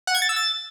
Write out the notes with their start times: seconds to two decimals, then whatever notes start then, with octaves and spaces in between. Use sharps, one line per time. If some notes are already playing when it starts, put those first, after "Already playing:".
0.07 F#5
0.15 G#6
0.22 A6
0.29 E6
0.36 A6